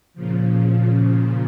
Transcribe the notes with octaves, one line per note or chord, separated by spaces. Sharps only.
A#2 C#3 F3